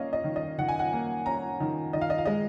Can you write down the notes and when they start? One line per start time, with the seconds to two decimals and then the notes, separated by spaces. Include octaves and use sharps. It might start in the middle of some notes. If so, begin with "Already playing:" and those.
Already playing: A#3 C#4 D#5 F5
0.13 D#5
0.24 D#3
0.36 D#5
0.58 D#3 F#5
0.69 G#5
0.79 F#5
0.93 A#3
1.26 C#4 A#5
1.60 D#3
1.93 D#3 D#5
2.01 F5
2.10 D#5
2.18 F5
2.26 G#3 D#5